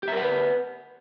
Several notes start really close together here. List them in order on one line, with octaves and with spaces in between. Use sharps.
G4 E5 A#4 F#5 B4